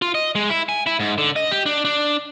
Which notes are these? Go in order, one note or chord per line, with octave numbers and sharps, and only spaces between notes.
F4
D#5
G#3
E4
G#5
E4
G#2
D3
D#5
G4
D4
D4